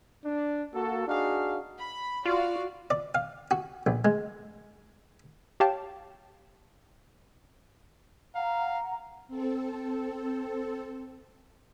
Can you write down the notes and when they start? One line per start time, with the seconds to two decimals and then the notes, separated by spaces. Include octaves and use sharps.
0.25 D4
0.74 A#3 F#4 A4
1.07 D4 D#4 F#4 G#4 F5
1.80 B5
2.26 F4 F#4 D5 F5
2.90 D5
3.15 F5
3.51 F#4
3.87 A#1
4.05 G#3
5.60 G4 C#5 F5 G5 A5
8.35 F5 F#5 A#5
9.28 C4 A4